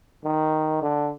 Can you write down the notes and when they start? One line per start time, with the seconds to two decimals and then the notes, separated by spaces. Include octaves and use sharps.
0.24 D#3
0.82 D3